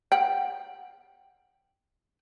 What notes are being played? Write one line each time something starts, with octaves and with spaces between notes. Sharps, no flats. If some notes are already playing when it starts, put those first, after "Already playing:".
F#5 G5